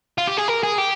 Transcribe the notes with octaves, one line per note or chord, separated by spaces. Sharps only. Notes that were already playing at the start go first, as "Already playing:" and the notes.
F4
G4
G#4
A#4
G#4
G4